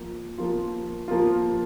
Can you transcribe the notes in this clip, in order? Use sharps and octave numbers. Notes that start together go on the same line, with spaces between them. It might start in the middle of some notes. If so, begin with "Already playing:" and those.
Already playing: F3 A#3 F4
F3 A#3 F4
F3 A#3 F4